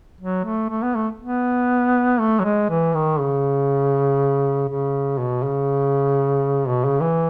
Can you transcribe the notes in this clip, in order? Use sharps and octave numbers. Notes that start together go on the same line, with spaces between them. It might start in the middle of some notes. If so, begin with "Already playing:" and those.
F#3
A3
A3
B3
A3
B3
A3
F#3
G#3
E3
D#3
C#3
C#3
B2
C#3
B2
C#3
E3